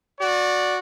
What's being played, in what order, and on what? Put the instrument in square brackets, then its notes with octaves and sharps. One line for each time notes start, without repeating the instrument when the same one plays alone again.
[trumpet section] F#4 D5